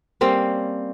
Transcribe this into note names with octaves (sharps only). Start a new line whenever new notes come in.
G3 A#3 C4 C#4